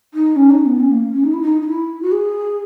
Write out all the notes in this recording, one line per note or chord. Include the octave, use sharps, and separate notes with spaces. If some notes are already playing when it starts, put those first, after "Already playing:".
D#4
C#4
D#4
B3
C#4
A#3
C#4
D#4
E4
D#4
D#4
E4
F#4
G#4